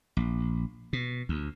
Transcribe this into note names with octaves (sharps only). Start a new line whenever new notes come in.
A#1
B2
D2